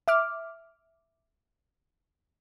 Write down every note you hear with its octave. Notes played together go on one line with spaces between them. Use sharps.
E5 D6 F6